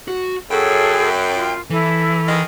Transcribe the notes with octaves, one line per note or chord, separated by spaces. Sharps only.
F#4
F#2 G#4 A4 G5
F4
E3 E4 A4
D#3 G#3